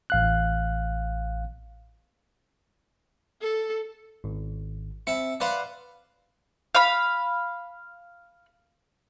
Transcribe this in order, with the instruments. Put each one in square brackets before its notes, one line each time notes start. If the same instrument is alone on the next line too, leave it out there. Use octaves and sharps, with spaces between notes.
[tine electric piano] A1 F5 F#6
[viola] A4
[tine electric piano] G#1
[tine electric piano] C4 C#7 [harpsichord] E4 A5
[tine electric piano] B4 D5 [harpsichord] C5 F5 F#5
[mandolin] F5 B5